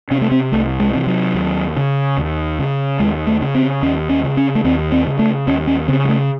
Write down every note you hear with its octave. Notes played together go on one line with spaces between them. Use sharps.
C3 C#4
A3
C4
C2 A3
G#3
C3 E3
F#3
D#2
C#3
D#2
C#3
D#2 G#3
A3
C#3
C4
D#2 C#4
C#4
C#3
C#4
A3
D#2 C4
C4
C#3
A3
D#2 C#4
C#4
C#3 C4
G#3
A3